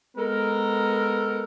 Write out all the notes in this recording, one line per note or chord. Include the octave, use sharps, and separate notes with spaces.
G#3 B3 A4 A#4